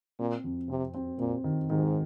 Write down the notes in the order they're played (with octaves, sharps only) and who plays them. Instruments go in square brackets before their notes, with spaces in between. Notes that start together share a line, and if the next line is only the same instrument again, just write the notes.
[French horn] A#2 [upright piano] C4
[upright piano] F2
[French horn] C3 [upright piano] C4
[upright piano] C4
[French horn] A#2 [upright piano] C4
[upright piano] D#3
[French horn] G#2 [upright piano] D#3